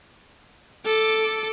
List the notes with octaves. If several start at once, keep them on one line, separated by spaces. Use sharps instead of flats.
A4 D6